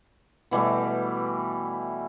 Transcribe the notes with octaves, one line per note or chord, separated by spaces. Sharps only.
B2 E3 G3 A3